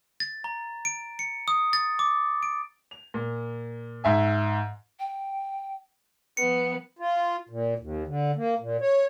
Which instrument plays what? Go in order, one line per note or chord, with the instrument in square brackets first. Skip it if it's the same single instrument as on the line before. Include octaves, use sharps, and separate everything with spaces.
[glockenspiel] A6
A#5
D7
C#7
D#6
A6
D6
D7
[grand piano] F7
A#2
G#2 E5 G#5
[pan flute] G5
[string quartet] F3 B3 [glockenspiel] C#7
[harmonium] F4
A#2
D#2
D3
A#3
A#2
C#5